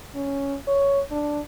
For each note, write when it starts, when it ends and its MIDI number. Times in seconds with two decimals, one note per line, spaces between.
0.15 0.56 61
0.67 1.01 73
1.11 1.40 62